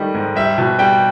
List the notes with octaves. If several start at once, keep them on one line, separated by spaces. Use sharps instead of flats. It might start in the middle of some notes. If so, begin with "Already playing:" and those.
Already playing: D#3 G3 A3 D#5
G#2
G3 E5
B2
G3 G5